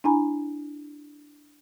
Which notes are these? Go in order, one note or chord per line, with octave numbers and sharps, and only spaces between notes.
D4 E4 G#5 A#5 B5